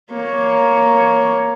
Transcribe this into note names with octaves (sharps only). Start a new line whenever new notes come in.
A#3 C#5